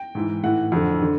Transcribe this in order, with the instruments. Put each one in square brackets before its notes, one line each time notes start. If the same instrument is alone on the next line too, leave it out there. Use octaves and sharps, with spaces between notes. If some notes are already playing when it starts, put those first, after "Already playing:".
Already playing: [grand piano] G5
G#2 E3
A2 E3 F#5
F2 D3
D3